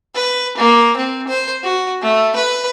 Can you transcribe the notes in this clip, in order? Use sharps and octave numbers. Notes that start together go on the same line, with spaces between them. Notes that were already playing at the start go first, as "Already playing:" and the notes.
B4
A#3
C4
C5
F#4
A3
B4